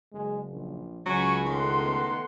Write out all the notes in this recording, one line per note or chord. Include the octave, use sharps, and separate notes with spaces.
F#1 G#3
A#1
C#2 F#3 C#4 G#5 B5 C#6
A2 D#3 F#5 C6
B3